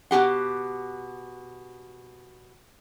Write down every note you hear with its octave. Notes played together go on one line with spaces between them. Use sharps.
B2 F4 G4 F#5